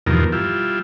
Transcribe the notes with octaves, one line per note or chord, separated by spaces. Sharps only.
E2 G2 B2 D#3 F3 A#4
G3 E4 F4